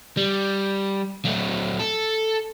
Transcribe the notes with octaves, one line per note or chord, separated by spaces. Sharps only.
G3
F#3 A3
A4